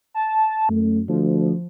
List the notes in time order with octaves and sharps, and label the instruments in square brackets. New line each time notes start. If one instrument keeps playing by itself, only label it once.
[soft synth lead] A5
[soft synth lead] F#2 [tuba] A3
[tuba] D2 [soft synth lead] F3